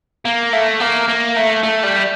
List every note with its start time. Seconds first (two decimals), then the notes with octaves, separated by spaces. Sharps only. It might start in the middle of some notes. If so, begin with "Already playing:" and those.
0.25 A#3
0.53 A3
0.80 A#3
1.08 A#3
1.36 A3
1.63 A3
1.84 G3